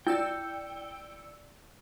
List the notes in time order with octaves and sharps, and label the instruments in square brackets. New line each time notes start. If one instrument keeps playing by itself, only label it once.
[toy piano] E4 [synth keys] D5 E6 C#7 [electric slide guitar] G5